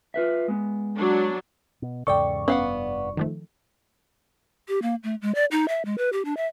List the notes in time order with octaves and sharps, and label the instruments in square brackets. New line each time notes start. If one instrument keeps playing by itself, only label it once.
[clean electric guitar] F4 B4 E5
G#3 B3
[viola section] F#3 D4
[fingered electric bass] B2
[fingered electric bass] E2 G#2 C#3 [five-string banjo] A4 G5 [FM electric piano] D5 C#6
[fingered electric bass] F1 G2 [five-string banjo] B3 F5 F#5 [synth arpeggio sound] C#4
[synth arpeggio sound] D#3 F3 A3
[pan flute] G4
A#3
A3
G#3
D5
D#4
E5
G#3
B4
G4
D4
E5